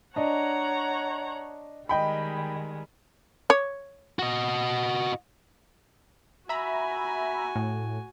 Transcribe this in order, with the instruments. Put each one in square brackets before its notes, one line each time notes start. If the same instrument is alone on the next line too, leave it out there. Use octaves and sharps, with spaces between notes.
[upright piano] D4 D#5 [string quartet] C#5 F#5 A#5
[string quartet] D#3 G3 G#3 [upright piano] D#5 G5 B5
[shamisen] C#5
[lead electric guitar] F#4 D#5
[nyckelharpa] F#4 G#5 [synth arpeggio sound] E5 A#5 B5
[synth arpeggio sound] A2